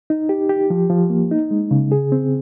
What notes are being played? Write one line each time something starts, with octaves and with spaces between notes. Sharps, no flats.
D#4
G4
G4
F3
F3
A#3
D#4
G#3
C#3
G#4
C4